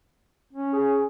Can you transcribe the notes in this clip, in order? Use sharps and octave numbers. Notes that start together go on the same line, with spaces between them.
C#4
G#4